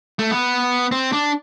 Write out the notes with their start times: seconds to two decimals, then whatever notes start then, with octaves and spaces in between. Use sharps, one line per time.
0.19 A3
0.31 B3
0.92 C4
1.12 D4